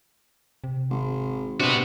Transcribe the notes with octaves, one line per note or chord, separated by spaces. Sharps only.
C3
G#1
C3 B3 D4 F#4